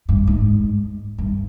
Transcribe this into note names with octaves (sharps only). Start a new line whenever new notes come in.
G2
G#2
G2